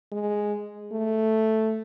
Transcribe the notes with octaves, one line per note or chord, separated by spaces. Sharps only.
G#3
A3